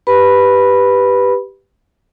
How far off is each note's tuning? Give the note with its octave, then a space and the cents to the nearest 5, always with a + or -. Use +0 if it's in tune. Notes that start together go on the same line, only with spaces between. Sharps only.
G4 +0 B4 +0 B5 -5